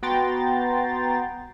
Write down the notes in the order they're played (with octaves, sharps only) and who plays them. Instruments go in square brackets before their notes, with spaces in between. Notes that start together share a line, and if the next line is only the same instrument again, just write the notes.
[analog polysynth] B3 F#4 G5 A#5 C6 A6